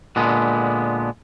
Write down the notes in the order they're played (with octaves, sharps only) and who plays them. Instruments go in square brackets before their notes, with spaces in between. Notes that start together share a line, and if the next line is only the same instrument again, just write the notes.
[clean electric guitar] A#2 D3 G#3 B3